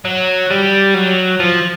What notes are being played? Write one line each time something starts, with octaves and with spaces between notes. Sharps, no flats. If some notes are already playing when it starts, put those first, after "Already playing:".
F#3
G3
F#3
F3